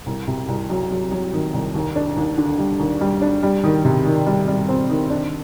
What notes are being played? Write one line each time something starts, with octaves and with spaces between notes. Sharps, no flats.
C2
C3
C2
F#3
F#3
F#3
D#3
C2
D#2
D4
D#2
D3
G3
D#2
G3
D4
G3
D#3
C3
D#3
G3
G3
C4
D#3
D4